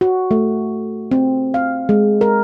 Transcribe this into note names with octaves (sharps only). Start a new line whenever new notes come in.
F#4
A3
C4
F5
G#3
A#4